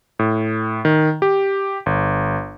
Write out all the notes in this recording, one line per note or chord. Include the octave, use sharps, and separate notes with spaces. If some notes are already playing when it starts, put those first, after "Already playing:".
A2
D#3
G4
G1